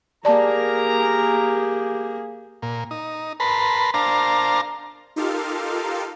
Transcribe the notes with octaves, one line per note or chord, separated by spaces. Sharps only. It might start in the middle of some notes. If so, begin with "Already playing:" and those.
A#3 G4 G#4 A#4 D5 A5 A#5
A#2
D#4
A#4 B4 A5 B5 C6
D4 A#4 C5 F5 A5 A#5
D#4 F4 G4 A4 A#4 F5